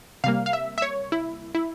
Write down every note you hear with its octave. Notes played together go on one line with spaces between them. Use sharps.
C3 G3 A#3 F5
F5
E5
E5
C#5
E4
E4